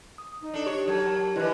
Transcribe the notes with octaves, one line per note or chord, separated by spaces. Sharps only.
D#6
D#4
D4 A4
G4 C#5
F#3 A#4 A5 G#6
D3 E3 E4 B4 D#5 F#6